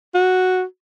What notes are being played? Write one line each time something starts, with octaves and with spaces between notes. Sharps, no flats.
F#4